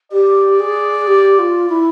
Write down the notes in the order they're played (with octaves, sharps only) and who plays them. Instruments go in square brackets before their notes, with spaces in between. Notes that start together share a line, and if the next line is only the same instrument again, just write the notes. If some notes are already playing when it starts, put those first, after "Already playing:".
[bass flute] G4 [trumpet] D5
[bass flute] G#4
G4
F4
E4